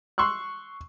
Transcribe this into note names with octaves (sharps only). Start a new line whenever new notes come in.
C6 C#6 E6 F#6